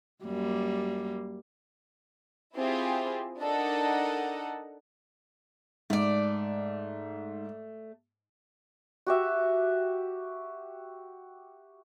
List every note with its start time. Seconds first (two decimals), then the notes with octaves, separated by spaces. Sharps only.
0.24 F#2 G3 A#3
2.55 C4 E4 F4 G4 G#4
3.40 D4 D#4 A4 A#4 D#5 F#5
5.90 G#2 A3 D5
9.07 F#4 G4 E5